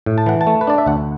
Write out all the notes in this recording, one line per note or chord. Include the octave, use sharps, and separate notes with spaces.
A2
A5
E3 F#5
A5
A3
B4
D4 D5
E5
D2 F#5